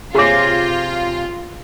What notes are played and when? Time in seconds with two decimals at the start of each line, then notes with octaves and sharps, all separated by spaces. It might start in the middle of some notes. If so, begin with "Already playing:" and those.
0.15 C3 C4 F4 G#4 C#5 D6